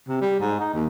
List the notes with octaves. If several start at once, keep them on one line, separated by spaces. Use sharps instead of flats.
C3
G3
G#2
D#4
D#2